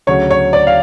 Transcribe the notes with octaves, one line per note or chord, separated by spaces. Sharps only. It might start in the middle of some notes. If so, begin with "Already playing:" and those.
D2 C#3 F#3 C#5
C#5
D5
F5